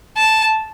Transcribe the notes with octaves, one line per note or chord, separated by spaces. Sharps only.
A5